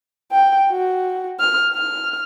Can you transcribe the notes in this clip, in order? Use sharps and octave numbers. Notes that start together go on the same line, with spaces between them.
G5
F#4
F6
F6